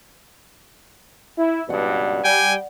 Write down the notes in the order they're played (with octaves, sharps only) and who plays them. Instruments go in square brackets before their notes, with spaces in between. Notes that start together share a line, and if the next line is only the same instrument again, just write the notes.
[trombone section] E4
[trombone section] C#2 G2 B2 [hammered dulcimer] D5 F#5
[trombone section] G3 [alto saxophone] G5 [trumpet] G#5